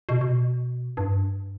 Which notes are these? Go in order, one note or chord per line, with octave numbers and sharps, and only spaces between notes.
B2
B2
G2